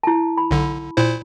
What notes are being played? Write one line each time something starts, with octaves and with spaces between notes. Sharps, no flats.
E4 A5
B5
B1 D3
A#2 E4 C5